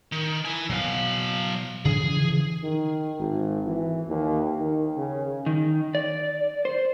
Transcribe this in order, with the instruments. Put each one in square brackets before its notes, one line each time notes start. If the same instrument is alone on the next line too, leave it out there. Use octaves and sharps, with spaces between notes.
[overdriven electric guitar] D#3
E4 G#5
[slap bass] B2 [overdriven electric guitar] F#3 F5
[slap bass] C#3 E3 F3 [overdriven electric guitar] G#4
[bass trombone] D#3
G#1
E3
D#2
D#3
C#3
[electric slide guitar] D#3
D5
C5